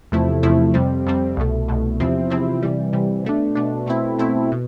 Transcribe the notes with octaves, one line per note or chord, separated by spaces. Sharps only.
E2 C3 F3 A3 E4
E2 C3 F3 A3 E4
F2 C3 G3 C4
F2 C3 G3 C4
C2 B2 A3
C2 B2 A3
E2 C3 F3 C4 E4
E2 C3 F3 C4 E4
C3 E3 G3
C3 E3 G3
B2 A3 D4
B2 A3 D4
B2 A3 C4 E4
B2 A3 C4 E4
B2